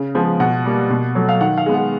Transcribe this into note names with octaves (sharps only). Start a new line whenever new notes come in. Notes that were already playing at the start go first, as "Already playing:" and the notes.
Already playing: C#3
F3 G#3 B3
B2 F#5
G3 A#3
B2
F#3 A3
F5
D#3 F#5
F5
G#3 B3
F#5